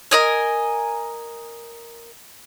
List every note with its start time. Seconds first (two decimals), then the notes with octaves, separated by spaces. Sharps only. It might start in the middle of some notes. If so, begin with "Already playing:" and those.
0.11 A#4 D#5 G#5